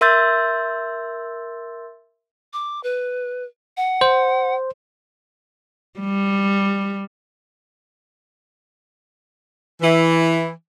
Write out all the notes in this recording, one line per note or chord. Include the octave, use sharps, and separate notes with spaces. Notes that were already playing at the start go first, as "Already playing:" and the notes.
A#4 E5 C6 E6 G6 A6
D6
B4
F#5
C5
G3
E3